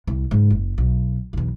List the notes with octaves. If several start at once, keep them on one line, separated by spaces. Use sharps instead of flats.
C2
G#2 C#3
F#1
B1
B1 E2